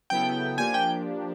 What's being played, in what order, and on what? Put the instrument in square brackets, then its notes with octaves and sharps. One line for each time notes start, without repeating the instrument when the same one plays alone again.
[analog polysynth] C#3 F#3 B3 E4 A4 [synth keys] G5
[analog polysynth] F3 A#3 D4 G4 [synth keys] G#5
[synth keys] G5